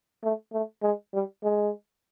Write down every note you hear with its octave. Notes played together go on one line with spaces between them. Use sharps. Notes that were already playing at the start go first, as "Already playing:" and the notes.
A3
A3
G#3
G3
G#3